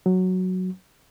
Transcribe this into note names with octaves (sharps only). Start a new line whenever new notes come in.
F#3